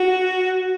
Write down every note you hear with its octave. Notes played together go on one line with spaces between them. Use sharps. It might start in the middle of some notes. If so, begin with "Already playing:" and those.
Already playing: F#4